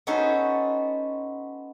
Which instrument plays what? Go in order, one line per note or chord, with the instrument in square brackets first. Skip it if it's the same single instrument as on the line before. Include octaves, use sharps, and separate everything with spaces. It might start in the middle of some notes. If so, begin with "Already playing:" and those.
[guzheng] B3 C#4 D#4 F#4 A4 C5